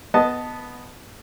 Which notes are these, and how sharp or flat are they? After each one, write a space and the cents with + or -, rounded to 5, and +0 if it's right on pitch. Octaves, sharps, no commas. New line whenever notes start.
B3 +0 D#5 +0 A5 +0